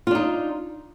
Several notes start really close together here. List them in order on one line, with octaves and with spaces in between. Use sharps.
F4 D4 D#4